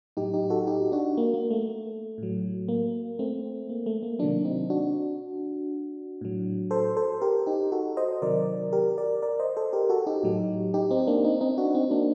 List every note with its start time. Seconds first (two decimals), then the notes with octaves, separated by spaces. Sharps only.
0.17 A2 F#3 D#4 G4
0.34 D#4 G4
0.50 F#4 A4
0.67 D#4 G4
0.92 D4 F#4
1.17 A#3
1.34 A#3
1.51 A3
2.18 A2 F#3
2.68 A#3
3.19 A3 C4
3.69 A#3
3.86 A3
4.03 A#3
4.19 C3 D#3 F#3 A#3 D4
4.44 C4 D#4
4.70 D4 F#4
6.21 A2 F#3
6.71 A4 C5
6.97 A4 C5
7.21 G4 A#4
7.46 D#4 G4
7.72 F#4 A4
7.97 C5 D#5
8.22 C3 D#3 F#3 A#4 D5
8.73 G4 A#4
8.98 A#4 D5
9.22 A#4 D5
9.39 C5 D#5
9.57 A4 C5
9.73 G4 A#4
9.89 F#4 A4
10.07 D#4 G4
10.23 A2 F#3
10.74 D#4 G4
10.91 C4 D#4
11.07 A#3 D4
11.24 C4 D#4
11.41 C4 D#4
11.58 D4 F#4
11.74 C4 D#4
11.91 A#3 D4